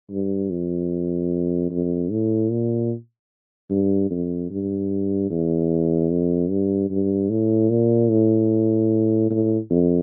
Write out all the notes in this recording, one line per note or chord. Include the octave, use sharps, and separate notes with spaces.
G2
F2
F2
A2
A#2
G2
F2
G2
E2
F2
G2
G2
A2
A#2
A2
A2
F2